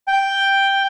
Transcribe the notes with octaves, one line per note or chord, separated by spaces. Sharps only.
G5